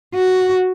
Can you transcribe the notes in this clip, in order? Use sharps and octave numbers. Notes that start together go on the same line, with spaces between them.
F#4